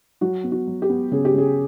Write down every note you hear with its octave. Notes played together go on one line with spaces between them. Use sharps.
F#3 F#4
B3
F#4
F#3
G4
B3
C#3 G#4
G4
C#3 G#4